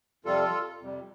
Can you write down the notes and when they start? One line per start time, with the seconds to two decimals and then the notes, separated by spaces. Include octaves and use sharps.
0.25 F2 C3 G3 F4 A4
0.80 F2 C3 G3